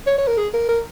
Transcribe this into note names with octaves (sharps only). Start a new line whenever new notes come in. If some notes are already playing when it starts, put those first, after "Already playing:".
C#5
C#5
A#4
G#4
A#4
A#4